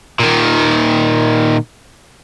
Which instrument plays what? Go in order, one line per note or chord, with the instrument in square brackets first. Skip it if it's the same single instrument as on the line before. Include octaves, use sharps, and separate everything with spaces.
[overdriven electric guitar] A#2 D#3